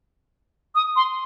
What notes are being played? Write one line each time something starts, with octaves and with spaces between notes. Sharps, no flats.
D#6
C6